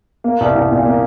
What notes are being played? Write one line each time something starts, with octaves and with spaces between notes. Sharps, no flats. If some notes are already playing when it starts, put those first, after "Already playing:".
A#3
C2
C2
A#2
A#3